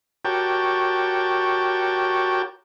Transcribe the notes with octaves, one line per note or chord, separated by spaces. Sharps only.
F#4 G4 A#4 C#5 G5 A5